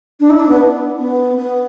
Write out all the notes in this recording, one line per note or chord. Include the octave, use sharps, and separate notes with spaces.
D4
E4
D4
B3
B3
B3